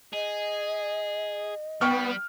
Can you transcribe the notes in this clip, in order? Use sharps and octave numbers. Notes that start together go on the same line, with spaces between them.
G#4 D#5
G3 B3 G5 C#6 F6